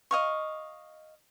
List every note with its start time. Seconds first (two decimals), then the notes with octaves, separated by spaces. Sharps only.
0.11 D#5 F5 C#6